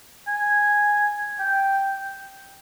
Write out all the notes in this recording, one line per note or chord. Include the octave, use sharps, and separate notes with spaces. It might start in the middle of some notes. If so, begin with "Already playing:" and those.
G#5
G5